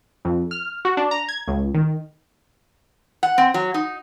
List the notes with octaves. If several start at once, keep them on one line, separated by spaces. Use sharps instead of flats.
F2
F6
F#4
D4
A#5
G#6
C#2
D#3
F#5
C4
F#3
D#4